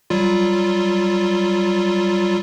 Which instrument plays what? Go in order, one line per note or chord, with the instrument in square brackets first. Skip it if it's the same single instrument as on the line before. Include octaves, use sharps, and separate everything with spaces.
[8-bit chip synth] F#3 G3 F4